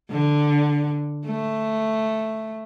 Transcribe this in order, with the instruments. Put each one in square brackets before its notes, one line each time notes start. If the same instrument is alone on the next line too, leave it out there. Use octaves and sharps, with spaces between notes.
[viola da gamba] D3
A3